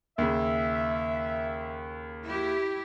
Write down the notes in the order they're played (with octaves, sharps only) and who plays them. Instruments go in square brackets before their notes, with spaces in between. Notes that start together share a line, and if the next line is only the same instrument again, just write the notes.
[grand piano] D#2 C#3 [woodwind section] E5
[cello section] E4 G4